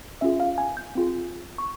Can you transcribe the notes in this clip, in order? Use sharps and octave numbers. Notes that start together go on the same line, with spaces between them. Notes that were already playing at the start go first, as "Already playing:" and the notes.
C#4 F4 G#4 E5
F5
G#5
G6
C4 F4 G#4
C#6